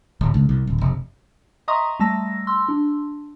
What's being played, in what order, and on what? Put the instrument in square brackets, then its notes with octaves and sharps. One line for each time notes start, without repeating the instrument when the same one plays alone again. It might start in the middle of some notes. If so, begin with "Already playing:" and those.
[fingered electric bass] D1
C#2
C2
D1
F1
[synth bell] D#5 E5 A#5 C6 C#6 D#6
G3 A3 A5 E6 A#6
C6 E6
D4